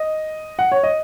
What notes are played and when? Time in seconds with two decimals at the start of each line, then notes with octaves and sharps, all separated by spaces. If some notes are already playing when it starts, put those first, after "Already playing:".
Already playing: D#5
0.59 F#5
0.72 C#5
0.83 D#5